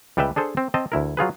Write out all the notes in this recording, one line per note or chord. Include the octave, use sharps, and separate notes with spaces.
C#2 G3 G4 B4 E5 G5
D4 G#4 A4 C5
C4
C4 D#5 A5
D2 E4 A#4
F#3 F4 G#4 B4